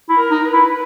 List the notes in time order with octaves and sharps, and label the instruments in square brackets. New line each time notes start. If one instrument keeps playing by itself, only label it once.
[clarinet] E4
[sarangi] A#4
[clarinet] D#4
[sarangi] B4
[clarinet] E4